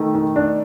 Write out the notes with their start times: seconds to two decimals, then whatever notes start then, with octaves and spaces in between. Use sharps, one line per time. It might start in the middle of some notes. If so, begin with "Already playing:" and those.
Already playing: D#3 A3
0.15 D#3
0.36 D4